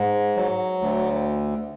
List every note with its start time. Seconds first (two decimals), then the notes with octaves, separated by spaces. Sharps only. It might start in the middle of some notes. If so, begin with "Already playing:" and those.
Already playing: G#2
0.37 F#3
0.81 D2